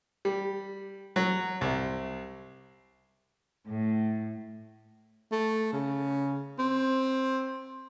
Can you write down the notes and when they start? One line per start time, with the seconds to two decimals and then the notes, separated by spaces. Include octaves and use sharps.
0.25 G3
1.16 F#3
1.61 C2
3.68 A2
5.32 A3
5.73 C#3
6.59 C4